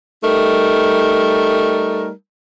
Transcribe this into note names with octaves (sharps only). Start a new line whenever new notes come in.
G3 A3 D#4 A#4